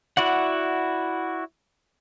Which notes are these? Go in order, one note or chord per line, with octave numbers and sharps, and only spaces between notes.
E4 F#4 D5 F#5